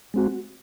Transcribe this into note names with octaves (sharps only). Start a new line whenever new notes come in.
G#3 C4 F#4